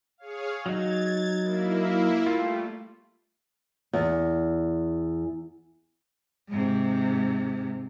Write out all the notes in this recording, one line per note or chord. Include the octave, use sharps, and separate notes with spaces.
G#4 C#5 F5
F#3 D#4 G#6 A6
A#3 E4
G3 A3 F4
E2
G#2 C3